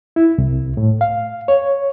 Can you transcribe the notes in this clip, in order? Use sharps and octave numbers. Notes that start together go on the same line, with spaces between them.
E4
C2
A2
F5
C#5